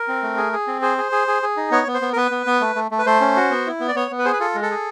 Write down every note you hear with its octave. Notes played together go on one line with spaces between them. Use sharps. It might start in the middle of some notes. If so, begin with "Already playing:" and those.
Already playing: A#4
C4
A3
G#4
G#4
C4
G#4 C5
G#4
G#4
G#4
G#4
D#4
B3 C#5
B3
C5
B3
A#4
B3 B4
B3
B3
A3
A3
A3
B4
A3 C5
C#4
F#4
B3
E4
B3
D5
B3 C#5
B3
B4
G#4 C5
B4
F4 A4
G#3
A4
G#4